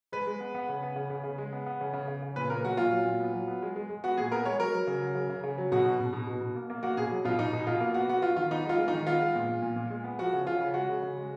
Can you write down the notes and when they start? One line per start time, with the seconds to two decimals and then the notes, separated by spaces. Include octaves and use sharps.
0.12 G#3 B4
0.27 G#3
0.40 B3
0.54 B3
0.69 C#3
0.83 B3
0.96 C#3
1.10 C#3
1.24 C#3
1.38 G#3
1.53 B3
1.66 B3
1.81 C#3
1.93 C#3
2.08 C#3
2.22 C#3
2.36 A#2 B4
2.50 A#2 A#4
2.64 F#3 F#4
2.77 A#2 F4
2.92 F#3
3.05 A#2
3.20 B3
3.34 F#3
3.47 B3
3.62 G#3
3.76 G#3
3.90 G#3
4.04 B3 F#4
4.17 A#2 G#4
4.32 B3 A#4
4.45 G#3 C#5
4.59 F#3 A#4
4.73 F#3
4.87 C#3
5.02 F#3
5.15 C#3
5.29 C#3
5.43 C#3
5.58 F#3
5.72 B2 F#4
5.85 B2
6.00 B2
6.13 B2
6.27 B2
6.41 B2
6.56 A#3
6.70 A#3
6.83 A#3 F#4
6.97 B2 G#4
7.11 F#3
7.25 B2 F4
7.39 B2 D#4
7.53 B2
7.67 B2 F4
7.80 A#3
7.94 B3 F#4
8.09 B3 F#4
8.22 B3 F4
8.36 D#3 F4
8.51 B3 D#4
8.65 G#3
8.69 F4
8.78 G#3
8.88 D#4
8.93 D#3
9.07 B3 F4
9.21 G#3
9.35 A#2
9.49 A#2
9.62 A#2
9.76 A#2
9.90 G#3
10.04 B3
10.19 F3 F#4
10.33 C#3
10.47 C#3 F4
10.60 C#3
10.74 G#3 F#4
10.89 C#3
11.02 C#3
11.17 G#3